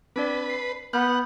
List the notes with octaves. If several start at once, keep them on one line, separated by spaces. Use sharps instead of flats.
C4 D4 B4 D5
C7
B3 F#5 B5 F6 G6